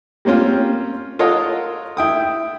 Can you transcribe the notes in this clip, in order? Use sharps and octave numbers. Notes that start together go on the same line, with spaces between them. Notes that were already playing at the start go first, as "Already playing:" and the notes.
G3 A#3 C4 C#4 F4
F4 A4 A#4 C#5 D#5 F#5
E4 G5 D#6